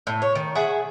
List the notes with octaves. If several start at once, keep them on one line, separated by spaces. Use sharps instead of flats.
A2
C#5
D#3
G#4 E5 F#5